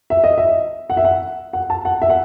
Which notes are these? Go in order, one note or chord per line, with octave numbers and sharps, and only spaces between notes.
E5
D#5
E5
F#5
E5
F#5
F#5
A5
F#5
E5
F#5